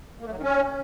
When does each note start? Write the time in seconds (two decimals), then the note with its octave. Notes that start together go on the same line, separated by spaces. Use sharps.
0.20 A#3
0.26 A3
0.32 F#3
0.37 D#3
0.43 C#4